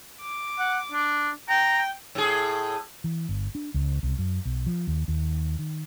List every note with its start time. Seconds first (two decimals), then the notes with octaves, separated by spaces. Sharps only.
0.22 D6
0.59 F#5
0.92 D4
1.49 G5 A#5
2.15 A2 G#4
3.04 E3
3.29 G1
3.55 D4
3.74 C#2
4.03 C2
4.18 F#2
4.45 B1
4.66 F3
4.87 D#2
5.08 D#2
5.59 D#3